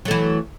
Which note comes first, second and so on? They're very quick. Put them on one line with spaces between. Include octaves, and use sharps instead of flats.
F#3 A3 E3